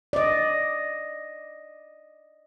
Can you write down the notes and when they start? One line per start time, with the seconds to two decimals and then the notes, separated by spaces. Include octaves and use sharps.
0.13 D5 D#5